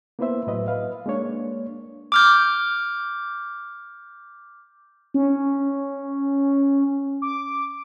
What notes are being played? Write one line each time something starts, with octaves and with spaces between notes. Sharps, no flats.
A#3 B3 E4 B4 C5 E5
A2 F#3 B4 D#5 E5
B4 F5
G#3 A#3 D4 C#5
D6 F6 G6
C#4
D6